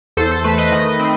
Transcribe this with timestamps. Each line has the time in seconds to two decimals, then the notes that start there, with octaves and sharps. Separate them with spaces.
0.17 E2 A4 C5
0.31 A4
0.44 A3 B4
0.58 B4 D#5
0.72 D#3
1.00 C4